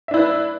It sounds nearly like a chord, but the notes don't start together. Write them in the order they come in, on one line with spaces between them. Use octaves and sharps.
E5 D4 E4 B4